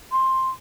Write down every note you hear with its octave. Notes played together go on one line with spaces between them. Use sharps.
C6